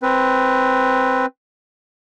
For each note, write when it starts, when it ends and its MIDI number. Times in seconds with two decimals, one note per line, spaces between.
0.03 1.26 60
0.03 1.26 71